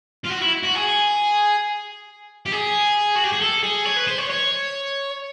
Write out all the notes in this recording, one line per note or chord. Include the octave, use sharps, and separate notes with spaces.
F4
F#4
E4
F#4
G#4
G4
G#4
F#4
G4
G#4
A4
G#4
C#5
B4
C5
C#5
C#5